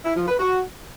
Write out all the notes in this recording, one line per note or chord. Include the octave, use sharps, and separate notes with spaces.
E4
F3
B4
F#4